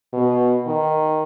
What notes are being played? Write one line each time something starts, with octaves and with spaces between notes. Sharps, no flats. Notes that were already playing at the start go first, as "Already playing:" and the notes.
B2
D#3